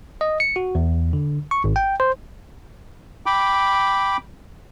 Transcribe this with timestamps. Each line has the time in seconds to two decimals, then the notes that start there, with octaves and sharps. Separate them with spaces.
0.21 D#5
0.40 C#7
0.56 F#4
0.75 E2
1.13 D3
1.51 C#6
1.64 G#1
1.76 G5
2.00 C5
3.26 G5 B5 D6